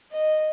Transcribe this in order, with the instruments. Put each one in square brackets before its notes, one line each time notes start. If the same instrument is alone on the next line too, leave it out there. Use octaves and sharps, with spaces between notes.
[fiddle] D#5